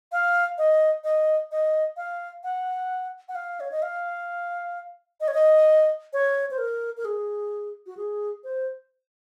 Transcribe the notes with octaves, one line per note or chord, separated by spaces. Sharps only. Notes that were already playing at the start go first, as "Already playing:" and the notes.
F5
D#5
D#5
D#5
F5
F#5
F#5
F5
C#5
D#5
F5
D#5
C#5
D#5
C#5
C5
A#4
A#4
G#4
F#4
G#4
C5